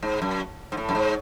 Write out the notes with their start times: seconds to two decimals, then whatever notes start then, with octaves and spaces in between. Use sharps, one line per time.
0.03 G#2
0.22 F#2
0.72 G#2
0.77 A2
0.89 F#2
0.95 G#2